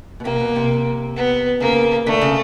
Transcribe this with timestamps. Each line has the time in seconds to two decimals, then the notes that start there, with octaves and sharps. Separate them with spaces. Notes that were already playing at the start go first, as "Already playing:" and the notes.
0.20 B2
0.24 C3 A#3
0.40 B2
0.56 C3
1.16 B3
1.60 C#3 A#3
2.06 D3 A3
2.21 C#3